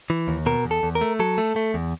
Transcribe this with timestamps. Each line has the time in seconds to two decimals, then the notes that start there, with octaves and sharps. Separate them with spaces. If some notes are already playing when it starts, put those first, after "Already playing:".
0.10 E3
0.28 D#2
0.46 B2 A#4
0.65 E2
0.71 A4
0.83 E2
0.95 A#4
1.01 A3
1.20 F#3 A4
1.38 A3
1.56 A3
1.74 E2